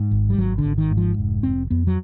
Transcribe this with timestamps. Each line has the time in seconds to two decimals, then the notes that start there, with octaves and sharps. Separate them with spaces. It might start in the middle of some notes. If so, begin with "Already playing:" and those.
Already playing: G#2
0.11 G#1
0.30 G3
0.38 G#1 F#3
0.58 D3
0.64 G#1
0.78 D#3
0.91 G#2
0.97 F3
1.18 F1
1.43 F1 C4
1.70 F2 B3
1.87 F#3